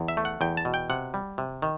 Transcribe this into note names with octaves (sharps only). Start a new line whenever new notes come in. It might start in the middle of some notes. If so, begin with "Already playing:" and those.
Already playing: E2
E5
A3
F#5
E2 G5
A5
B2
G5
C3 F#5
G3
C3
D#3